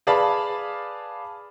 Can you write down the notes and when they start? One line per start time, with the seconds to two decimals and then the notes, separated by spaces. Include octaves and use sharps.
0.07 G#4 B4 D5 F5 A5 B5